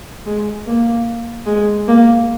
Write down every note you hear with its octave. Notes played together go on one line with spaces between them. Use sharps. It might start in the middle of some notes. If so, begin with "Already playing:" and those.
G#3
A#3
G#3
A#3